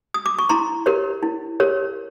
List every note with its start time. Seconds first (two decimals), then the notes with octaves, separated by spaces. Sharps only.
0.14 D#6
0.26 D6
0.39 C#6
0.49 E4 A#5 C6
0.86 G4 A#4 C#5
1.23 E4
1.60 G4 A#4 C#5